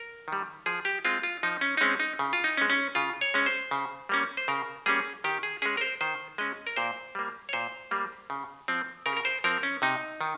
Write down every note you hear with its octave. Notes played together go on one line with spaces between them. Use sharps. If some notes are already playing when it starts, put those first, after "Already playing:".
Already playing: A#4
D#3 G3
F3 G#4
G4
G#3 C4 F4
F4
F3 D#4
C#4
D#4
G#3 C4 C#4
D#4
C#3
F4
D#4
C#4
G#3
C#4
C#3 F4
C#5
G#3 C#4
C5
C#3
G3 A#3 C#4
C5
C#3 A#4
G3 A#3 C#4 G#4
D#3 G4
G#4
G#3 C#4 G#4
A#4
C5
D#3 C5
G#3 C#4 D#5
A#4
A#2 C5
G3 A#3
C#5
A#2 C5
G3 A#3
C#3
F3 C4
C#3 A#4
A#4
C5
F3 C4 A#4
C#4
C3 D#4
D#3